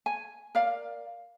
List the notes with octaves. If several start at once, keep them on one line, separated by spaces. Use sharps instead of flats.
G#5
A#4 D5 F5